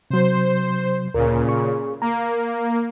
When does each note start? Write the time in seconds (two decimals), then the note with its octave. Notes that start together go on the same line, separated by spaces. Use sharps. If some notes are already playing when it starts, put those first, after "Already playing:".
0.11 C3 F#3 C5
1.14 D2 A#2 C#3 A#4
1.49 G#4 C#6
2.02 A#3 A#5